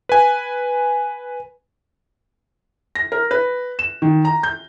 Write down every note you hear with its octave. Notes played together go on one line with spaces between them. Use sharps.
B4 G#5
A#6
A#4
B4
E7
D#3
A#5
G6